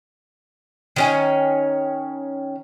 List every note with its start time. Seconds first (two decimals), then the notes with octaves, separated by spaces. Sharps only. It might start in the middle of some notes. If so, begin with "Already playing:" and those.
0.96 D#3 C#4 G#5